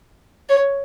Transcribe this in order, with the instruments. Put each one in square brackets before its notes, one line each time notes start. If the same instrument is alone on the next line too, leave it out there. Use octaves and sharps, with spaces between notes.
[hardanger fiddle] C#5